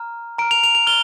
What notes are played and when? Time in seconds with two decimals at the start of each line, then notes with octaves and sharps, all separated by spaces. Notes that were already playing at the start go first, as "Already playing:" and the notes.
Already playing: A#5 F6
0.38 A#5 F6 D7
0.51 F7
0.63 F7
0.75 F7
0.87 F6 G7